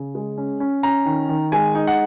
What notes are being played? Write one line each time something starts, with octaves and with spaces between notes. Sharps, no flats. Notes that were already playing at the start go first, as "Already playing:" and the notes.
Already playing: C#3
G#3
C#4
C#4
C#4 A#5
D#3
D#3
G#3 G#5
D#4
F#5